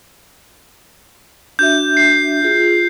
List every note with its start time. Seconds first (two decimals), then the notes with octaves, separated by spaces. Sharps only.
1.59 D4 F#4 E5 G6
1.97 C7
2.42 F4 G#4